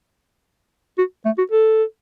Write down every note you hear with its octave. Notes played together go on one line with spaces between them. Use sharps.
F#4
A3
F#4
A4